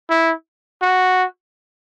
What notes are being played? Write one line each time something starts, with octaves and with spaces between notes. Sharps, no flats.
E4
F#4